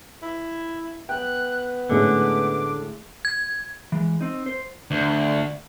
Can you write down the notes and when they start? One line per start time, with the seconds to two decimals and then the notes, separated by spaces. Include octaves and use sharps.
0.22 E4
1.09 B3 G5 F#6
1.89 A2 D3 G#3 C#4 D6
3.25 G#6
3.92 E3 G#3
4.21 C4 D#4
4.46 C5
4.91 D2